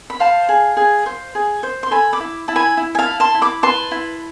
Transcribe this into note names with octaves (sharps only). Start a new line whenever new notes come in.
B5
C5 F5 A5
G#4
G#4
C5
G#4
C5
C6
A4 G#5 B5
B5 D6
E4
E4 A5
G#5 B5
E4
G#5
F5 A5
E4
A5 C6
E4
B5 D6
B4 A5 C6
E4